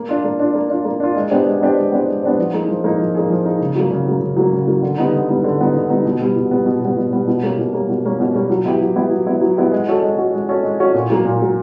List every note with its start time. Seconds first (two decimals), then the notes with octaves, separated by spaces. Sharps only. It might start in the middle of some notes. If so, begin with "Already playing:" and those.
Already playing: A#3
0.09 D4 F4
0.24 A#3
0.39 D4 F4
0.55 A#3
0.70 D4 F4
0.85 A#3
1.00 D4 F4
1.16 G#3
1.30 B3 D4 G4 C5
1.46 G#3
1.61 B3 D4 G4 C5
1.77 G#3
1.92 B3 D4 G4 C5
2.08 G#3
2.23 B3 D4 G4 C5
2.39 F3
2.53 A#3 D#4 G#4
2.69 F3
2.84 A#3 D#4 G#4
3.00 F3
3.15 A#3 D#4 G#4
3.30 F3
3.45 A#3 D#4 G#4
3.61 C#3
3.75 F#3 A#3
3.91 C#3
4.06 F#3 A#3
4.21 C#3
4.37 F#3 A#3
4.53 C#3
4.67 F#3 A#3
4.83 D3
4.98 G3 B3 D#4
5.13 D3
5.28 G3 B3 D#4
5.44 D3
5.60 G3 B3 D#4
5.74 D3
5.90 G3 B3 D#4
6.05 B2
6.20 G3 B3
6.36 B2
6.51 G3 B3
6.66 B2
6.81 G3 B3
6.97 B2
7.12 G3 B3
7.27 B2
7.42 G3 A#3 C#4
7.58 B2
7.73 G3 A#3 C#4
7.89 B2
8.04 G3 A#3 C#4
8.20 B2
8.35 G3 A#3 C#4
8.50 F#3
8.65 B3 E4 G4
8.81 F#3
8.96 B3 E4 G4
9.11 F#3
9.26 B3 E4 G4
9.41 F#3
9.56 B3 E4 G4
9.72 G#3
9.88 C#4 F#4 A4
10.02 G#3
10.17 C#4 F#4 A4
10.33 G#3
10.48 C#4 F#4 A4
10.63 G#3
10.79 C#4 F#4 A4
10.94 A#2
11.10 F#3 A#3
11.25 A#2
11.40 F#3 A#3